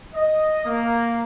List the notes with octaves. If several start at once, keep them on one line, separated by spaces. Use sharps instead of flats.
D#5
A#3